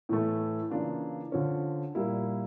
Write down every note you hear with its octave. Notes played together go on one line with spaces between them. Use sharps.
A2 E3 A3
C#3 E3 A#3 D4 F4
D3 F3 C#4
A#2 G3 A#3 E4